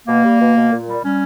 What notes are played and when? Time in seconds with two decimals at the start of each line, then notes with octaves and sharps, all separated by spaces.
0.06 B2 A#3
0.24 G3
0.40 B2
0.56 B2
0.71 A#2
0.88 G3
1.04 G3 C#4